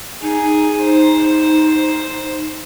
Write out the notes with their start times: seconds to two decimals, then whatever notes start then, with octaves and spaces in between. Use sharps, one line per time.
0.22 D#4 G#4
0.84 C5